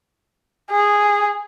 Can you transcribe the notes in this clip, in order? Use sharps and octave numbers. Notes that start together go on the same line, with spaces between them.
G#4